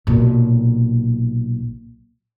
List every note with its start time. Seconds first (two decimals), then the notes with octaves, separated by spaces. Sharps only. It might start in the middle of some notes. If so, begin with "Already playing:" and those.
0.07 B1 A#2